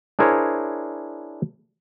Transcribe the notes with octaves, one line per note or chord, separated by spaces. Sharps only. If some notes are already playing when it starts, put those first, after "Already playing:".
D4 E4 G#4 A#4 C5 C#5